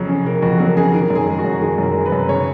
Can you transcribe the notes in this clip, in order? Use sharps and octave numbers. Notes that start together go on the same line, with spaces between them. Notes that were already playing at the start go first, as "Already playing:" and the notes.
Already playing: F2 C#3 F#3
C#4
C#3 A#4
F2 F#4
F#3 A#4
C#4 G#4
D#3 A#4
F#2
G#4
G#3
F#4
F#2
D#3 G#4
F#2 A#4
G#3
B4
F#2
C#3 C#5